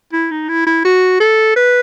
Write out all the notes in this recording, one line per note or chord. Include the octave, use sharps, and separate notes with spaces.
E4
D#4
E4
E4
F#4
A4
B4